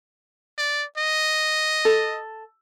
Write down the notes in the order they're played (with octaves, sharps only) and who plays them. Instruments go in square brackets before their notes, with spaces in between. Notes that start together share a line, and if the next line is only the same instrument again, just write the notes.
[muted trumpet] D5
D#5
[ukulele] A4